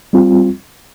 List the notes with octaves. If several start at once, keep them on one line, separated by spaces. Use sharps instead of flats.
G3 C4 F4